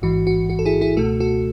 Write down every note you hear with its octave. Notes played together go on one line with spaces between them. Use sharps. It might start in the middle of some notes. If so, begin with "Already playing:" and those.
A1 G#2 E3 F#4
F#4
F#4
A4
E4 G#4
E4 G#4
C#2 B2 A3 F#4 A4
F#4 A4